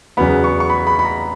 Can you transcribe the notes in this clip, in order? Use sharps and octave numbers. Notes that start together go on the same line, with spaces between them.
E2 C#3 F#3 B3 B5
C#6
C#6
B5
B5
B5
A#5